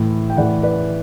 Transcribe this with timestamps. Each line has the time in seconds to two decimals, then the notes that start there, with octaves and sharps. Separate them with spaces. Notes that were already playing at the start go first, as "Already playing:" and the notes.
Already playing: A2 E3
0.30 G5
0.37 A2 E3 D5 F#5
0.63 B4 D5